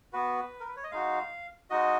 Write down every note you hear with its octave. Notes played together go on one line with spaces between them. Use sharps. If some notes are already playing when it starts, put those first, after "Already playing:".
B3 F#4 B4
A#4
B4
C#5
D#5
G#3 D#4 F#4 F5
G#3 D#4 F#4 D#5